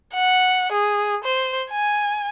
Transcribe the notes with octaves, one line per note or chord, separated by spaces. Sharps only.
F#5
G#4
C5
G#5